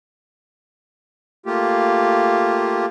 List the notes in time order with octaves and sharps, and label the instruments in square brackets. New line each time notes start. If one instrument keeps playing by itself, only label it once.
[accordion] A3 A#3 F4 G4